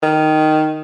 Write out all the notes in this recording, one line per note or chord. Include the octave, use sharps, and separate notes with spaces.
D#3